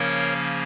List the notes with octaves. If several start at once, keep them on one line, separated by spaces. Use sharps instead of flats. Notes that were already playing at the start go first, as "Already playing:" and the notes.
Already playing: C#3 F3 A#3 C#4 A#4 C#5